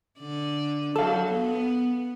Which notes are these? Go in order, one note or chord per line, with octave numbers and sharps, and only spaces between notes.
D3 D5
F#3 A4 F5
B3